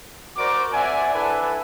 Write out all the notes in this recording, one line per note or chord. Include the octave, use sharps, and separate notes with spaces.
F#4 A#4 C5 D5 D6
C4 D5 E5 F#5 G#5
D4 E4 A4 B4 E5 G#5